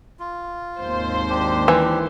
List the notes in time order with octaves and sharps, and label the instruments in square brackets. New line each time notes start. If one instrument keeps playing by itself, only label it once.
[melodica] F4
[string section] G#1 D#2 C5
[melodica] D4 G4
[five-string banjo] E3